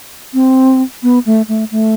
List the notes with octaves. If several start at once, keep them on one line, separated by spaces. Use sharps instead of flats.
C4
B3
A3
A3
A3